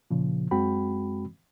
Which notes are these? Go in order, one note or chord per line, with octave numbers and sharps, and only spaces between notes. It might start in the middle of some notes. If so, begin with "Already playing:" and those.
A#2 C#3 F3
F#2 G#3 C4 F#4 G5 B5